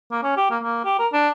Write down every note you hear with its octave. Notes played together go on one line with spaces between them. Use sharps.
A#3
C#4
G4
A#3
A#3
G4
A#4
D4